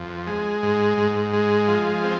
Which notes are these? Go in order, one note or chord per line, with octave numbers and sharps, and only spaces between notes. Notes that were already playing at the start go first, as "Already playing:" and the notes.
Already playing: F2
G#3
G#2
G#2
G#3
F3
C4